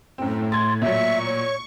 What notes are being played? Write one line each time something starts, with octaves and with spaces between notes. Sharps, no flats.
F#2 A2 C4
C6 G#6 A6
A#2 F#3 E5 C#6
C#5